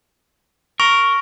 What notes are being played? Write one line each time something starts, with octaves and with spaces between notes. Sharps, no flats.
A#4 C#6